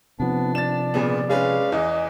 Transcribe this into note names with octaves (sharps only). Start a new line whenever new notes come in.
C3 F3 B3 D4
D5 A6 E7
A#2 C#3 B3
G#3 C#4 B4 F5
E2 E3 D#5